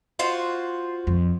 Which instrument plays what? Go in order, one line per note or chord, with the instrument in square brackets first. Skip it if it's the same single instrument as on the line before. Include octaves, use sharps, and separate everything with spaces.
[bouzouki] F4 F#4 C5
[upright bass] F2